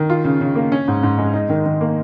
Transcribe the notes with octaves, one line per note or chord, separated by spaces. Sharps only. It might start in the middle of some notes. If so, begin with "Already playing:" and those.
Already playing: D#3
F4
C#3
C#3
A#3
C#4
G#2
G#2
G#3
D#4
D#3
D#3
A#3